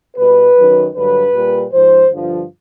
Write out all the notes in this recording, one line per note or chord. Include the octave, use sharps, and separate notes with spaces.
B2 G3 B4
F#2 D#3 F#3
G2 D3 F#3 B4
A#2 G3
G#2 F3 C5
G2 D3 F3